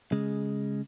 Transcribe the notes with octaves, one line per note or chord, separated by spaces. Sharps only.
C#3 G#3